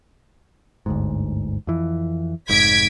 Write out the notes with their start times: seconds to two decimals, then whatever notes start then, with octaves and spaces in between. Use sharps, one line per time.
0.86 G1 D2 G#2
1.67 F2 E3
2.49 F1 G#2 G#6 B6 D7